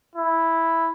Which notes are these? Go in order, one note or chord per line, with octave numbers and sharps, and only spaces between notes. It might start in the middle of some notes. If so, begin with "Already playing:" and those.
E4